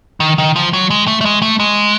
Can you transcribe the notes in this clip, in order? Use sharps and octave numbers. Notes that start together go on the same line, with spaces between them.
D#3
D#3
F3
F#3
G#3
A3
A3
G#3
A3
G#3